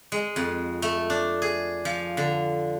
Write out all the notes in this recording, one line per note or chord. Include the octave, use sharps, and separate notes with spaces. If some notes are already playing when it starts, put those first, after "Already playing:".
G#3
F2
A3
D4
G#4
F3
D3